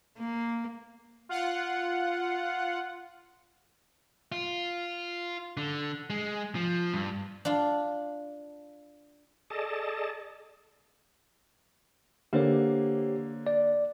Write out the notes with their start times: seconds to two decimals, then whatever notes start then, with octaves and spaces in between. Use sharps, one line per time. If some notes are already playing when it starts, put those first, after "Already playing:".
0.18 A#3
1.29 F4 F#5
4.32 F4
5.57 D3
6.10 G#3
6.55 F3
6.94 G2
7.45 D4 F4
9.50 G#4 A4 D5 D#5 A5
12.33 D3 A#3 G4 C5 C#5
13.47 D5